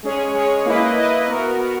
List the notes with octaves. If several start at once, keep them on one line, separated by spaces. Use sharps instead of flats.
G#3 C#4 G#4 C#5
G#3 C#4 G#4 C#5
A#3 E4 B4 D#5
A#3 E4 B4 D#5
B3 F#4 A#4
B3 F#4 A#4